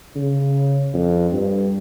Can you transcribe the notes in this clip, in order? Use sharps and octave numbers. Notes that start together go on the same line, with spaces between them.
C#3
F2
G2